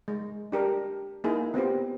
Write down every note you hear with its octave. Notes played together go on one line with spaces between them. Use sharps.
G#3
D4 G4 A#4
A#3 D#4 E4 G#4
B3 C4 F4 G4